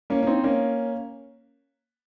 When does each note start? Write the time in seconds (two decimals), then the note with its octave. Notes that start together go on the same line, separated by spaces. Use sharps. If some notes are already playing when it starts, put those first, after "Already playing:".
0.10 A#3 C#4
0.23 C#4
0.27 C4 D#4
0.44 A#3 C#4